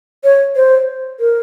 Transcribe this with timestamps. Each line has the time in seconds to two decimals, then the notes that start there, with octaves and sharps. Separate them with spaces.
0.24 C#5
0.56 C5
1.20 A#4